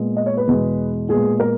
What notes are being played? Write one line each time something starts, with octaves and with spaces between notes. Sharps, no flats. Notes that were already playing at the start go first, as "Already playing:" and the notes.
Already playing: A#2 G#3 B3
D#5
C#5
B4
E2 B2 G#3
A#2 G#3 B3 G#4
A#4